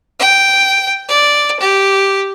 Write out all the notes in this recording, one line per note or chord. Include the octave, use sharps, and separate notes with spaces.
G5
D5
G4